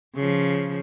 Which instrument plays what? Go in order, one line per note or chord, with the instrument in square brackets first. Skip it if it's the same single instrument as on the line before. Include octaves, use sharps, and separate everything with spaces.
[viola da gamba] C#3 F3